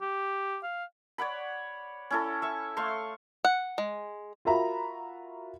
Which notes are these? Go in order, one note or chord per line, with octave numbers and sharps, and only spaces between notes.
G4
F5
C#5 D5 F#5 B5
C#4 E4 A4
E5 C#6
A3 F5 C6 C#6
F#5
G#3
F4 F#4 A#4 E5 A#5 B5